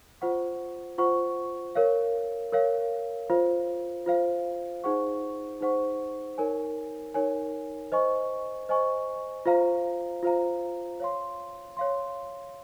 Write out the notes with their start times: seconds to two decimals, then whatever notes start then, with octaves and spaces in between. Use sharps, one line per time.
0.21 F4 C5 F#5 C#6
0.98 F4 C5 F#5 C#6
1.75 A#4 C#5 F5
2.52 A#4 C#5 F5
3.30 F4 C5 F5
4.06 F4 C5 F5
4.84 D#4 G#4 C5 F#5 C#6
5.61 D#4 G#4 C5 F#5 C#6
6.38 D#4 A#4 C#5 G#5
7.14 D#4 A#4 C#5 G#5
7.92 C5 D#5 G#5 C#6
8.69 C5 D#5 G#5 C#6
9.46 F4 C5 F5 A#5
10.23 F4 C5 F5 A#5
11.00 C#5 F5 C6
11.77 C#5 F5 C6